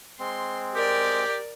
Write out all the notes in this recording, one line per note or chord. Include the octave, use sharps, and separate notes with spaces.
G#3 C4 C6
G4 A#4 D5